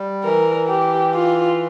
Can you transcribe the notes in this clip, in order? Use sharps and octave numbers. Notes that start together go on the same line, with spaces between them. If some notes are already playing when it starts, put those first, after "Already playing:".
Already playing: G3
E3 A#4
G4
F4